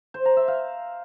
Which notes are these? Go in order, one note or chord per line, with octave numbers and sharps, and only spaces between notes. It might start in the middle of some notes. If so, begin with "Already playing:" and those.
C5
A#5
E5
F5